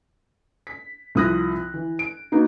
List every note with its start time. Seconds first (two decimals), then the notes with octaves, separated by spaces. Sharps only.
0.67 B6
1.15 C2 F3 D#6 F#6 A#6
1.74 E3
1.99 D7
2.32 A#3 B3 D#4 F#4